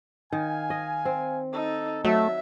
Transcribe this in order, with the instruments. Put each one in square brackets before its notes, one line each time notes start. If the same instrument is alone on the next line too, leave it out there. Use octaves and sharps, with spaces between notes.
[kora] D#3 [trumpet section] F5 G#5
[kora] D#5
C4
[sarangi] D#4 [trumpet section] A4
[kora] F#3 [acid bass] A3 [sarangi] E5 [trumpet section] A5